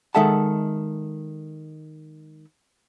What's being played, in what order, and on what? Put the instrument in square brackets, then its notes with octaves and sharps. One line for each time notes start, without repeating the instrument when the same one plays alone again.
[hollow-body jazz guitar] D#3 G#3 A4 E5 F#5 A5